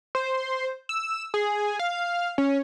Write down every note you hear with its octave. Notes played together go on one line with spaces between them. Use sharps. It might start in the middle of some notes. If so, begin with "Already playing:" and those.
C5
E6
G#4
F5
C#4